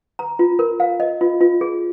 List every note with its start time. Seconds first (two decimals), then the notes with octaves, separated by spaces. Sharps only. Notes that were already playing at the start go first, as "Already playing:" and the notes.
0.19 A#5
0.39 F4
0.59 A#4
0.80 F5
1.00 D#5
1.21 F4
1.41 F4
1.61 G#4